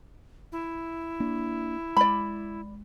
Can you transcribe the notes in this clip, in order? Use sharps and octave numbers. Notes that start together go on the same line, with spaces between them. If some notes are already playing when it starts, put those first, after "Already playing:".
E4
A#3 D4
G#3 D5 B5